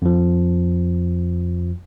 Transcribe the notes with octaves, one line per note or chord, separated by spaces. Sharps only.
F2 F3